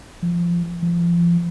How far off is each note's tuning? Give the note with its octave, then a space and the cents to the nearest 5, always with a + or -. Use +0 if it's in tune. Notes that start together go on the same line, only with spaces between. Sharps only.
F3 -15
F3 -30